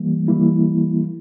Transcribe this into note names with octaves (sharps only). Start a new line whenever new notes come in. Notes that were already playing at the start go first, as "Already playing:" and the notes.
Already playing: E3 G3 A#3
E3 G3 A#3 E4